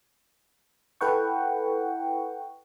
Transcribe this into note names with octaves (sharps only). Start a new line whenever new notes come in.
E4 A4 B4 F#5 G5 C#6